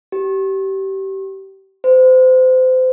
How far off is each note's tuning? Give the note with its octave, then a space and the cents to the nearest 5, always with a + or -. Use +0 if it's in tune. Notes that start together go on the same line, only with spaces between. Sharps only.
G4 -25
C5 -30